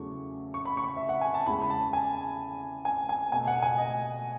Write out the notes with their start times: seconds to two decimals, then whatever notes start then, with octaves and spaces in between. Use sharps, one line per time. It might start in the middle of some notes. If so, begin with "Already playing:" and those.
Already playing: E2 C#3 F#3 A3 C#6
0.54 C#6
0.65 B5
0.77 C#6
0.97 E5
1.09 F#5
1.21 G#5
1.34 A5
1.46 E2 C#3 G#3 B5
1.62 B5
1.70 A5
1.93 G#5
2.85 G#5
3.09 G#5
3.32 B2 A3 G#5
3.47 F#5
3.62 G#5
3.78 D#5